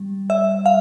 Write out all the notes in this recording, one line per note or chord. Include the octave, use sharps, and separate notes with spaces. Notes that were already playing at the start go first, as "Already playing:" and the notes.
Already playing: G3
E5
F5